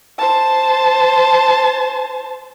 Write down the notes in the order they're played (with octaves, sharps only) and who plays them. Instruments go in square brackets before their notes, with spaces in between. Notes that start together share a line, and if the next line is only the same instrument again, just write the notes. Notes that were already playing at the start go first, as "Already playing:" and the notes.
[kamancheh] C5 A5